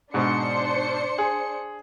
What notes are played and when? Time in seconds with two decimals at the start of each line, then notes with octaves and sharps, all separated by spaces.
0.14 G#2 B2 D4 C5 C#7
1.18 G#4